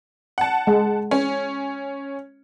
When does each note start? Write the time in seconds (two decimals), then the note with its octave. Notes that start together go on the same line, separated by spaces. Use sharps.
0.38 F#5 A5
0.67 G#3
1.11 C#4